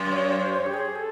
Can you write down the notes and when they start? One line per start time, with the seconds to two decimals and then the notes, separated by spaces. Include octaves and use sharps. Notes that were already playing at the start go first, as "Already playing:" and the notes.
Already playing: F#2
0.10 C#5
0.31 C#5
0.42 C5
0.53 C#5
0.66 G4
0.74 G#4
0.95 A4